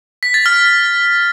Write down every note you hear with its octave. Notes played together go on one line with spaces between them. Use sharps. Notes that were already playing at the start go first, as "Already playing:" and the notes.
B6
A6
F6